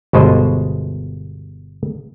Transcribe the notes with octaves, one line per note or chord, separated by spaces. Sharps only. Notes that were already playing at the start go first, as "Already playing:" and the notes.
G1 B2 G#3 C5 D#5